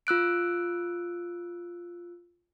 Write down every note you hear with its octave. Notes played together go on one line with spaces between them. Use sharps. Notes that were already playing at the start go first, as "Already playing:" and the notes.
F4 E6 F#6 D7